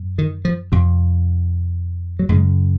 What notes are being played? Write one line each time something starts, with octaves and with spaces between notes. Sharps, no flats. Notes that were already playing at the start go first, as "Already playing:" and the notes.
Already playing: F#2
D#3
F3
F2 C3
F#3
F#2 C#3 G#3